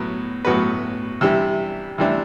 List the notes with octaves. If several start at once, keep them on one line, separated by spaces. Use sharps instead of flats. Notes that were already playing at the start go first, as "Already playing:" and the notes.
Already playing: A2 F#3 B3
A2 F#3 B3 F#4 B4
C3 E3 G3 D4
C3 E3 G3 D4